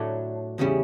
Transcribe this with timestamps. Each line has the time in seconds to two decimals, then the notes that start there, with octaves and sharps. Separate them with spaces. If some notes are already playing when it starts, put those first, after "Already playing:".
Already playing: A2 F#3 A3 D4
0.58 E2 C#3 G3 C#4 E4